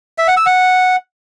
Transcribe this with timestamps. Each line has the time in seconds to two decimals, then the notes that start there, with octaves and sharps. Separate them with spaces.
0.18 E5
0.28 F#5
0.37 E6
0.46 F#5